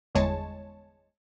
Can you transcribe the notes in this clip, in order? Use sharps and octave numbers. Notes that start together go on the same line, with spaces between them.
G1 E2 G#3 C#5 A5